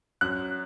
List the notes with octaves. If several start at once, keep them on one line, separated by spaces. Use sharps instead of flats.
F#2 F#6